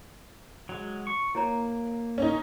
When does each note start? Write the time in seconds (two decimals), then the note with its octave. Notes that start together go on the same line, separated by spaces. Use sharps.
0.69 F#3 G#3
1.07 C#6
1.35 A#3 E4 C#5 A#5
2.18 C#4 D#4